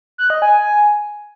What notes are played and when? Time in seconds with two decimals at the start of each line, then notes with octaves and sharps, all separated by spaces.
0.18 F#6
0.30 D#5
0.42 G#5